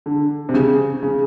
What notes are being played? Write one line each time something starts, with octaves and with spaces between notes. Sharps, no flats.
D3
C3
C#3
C#3